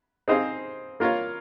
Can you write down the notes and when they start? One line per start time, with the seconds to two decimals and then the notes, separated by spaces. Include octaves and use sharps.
0.28 C4 D#4 G#4 C5 F5
1.00 A#3 F4 A#4 C#5 F5